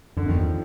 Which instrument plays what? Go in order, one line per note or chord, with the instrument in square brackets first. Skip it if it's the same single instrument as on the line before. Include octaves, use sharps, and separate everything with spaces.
[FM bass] F#2 [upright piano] D3
[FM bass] F2 [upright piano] D#3
[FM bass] E2 [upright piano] F3